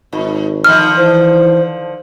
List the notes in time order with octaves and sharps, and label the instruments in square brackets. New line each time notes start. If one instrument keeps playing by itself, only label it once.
[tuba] G#1 [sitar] G#2
[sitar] D3 D#3 F3 [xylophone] F6
[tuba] E3 [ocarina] C5